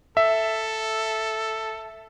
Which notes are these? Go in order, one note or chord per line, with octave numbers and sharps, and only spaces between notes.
A4 E5